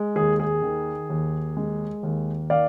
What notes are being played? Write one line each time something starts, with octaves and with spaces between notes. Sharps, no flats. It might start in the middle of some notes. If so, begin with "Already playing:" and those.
Already playing: G#3
D#2 G#4
G#4
D#3
D#2
G#3
D#2
D#3 D5 F5